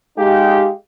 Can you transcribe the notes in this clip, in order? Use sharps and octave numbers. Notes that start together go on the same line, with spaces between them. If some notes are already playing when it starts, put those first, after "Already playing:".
G#3 D#4 G4 F5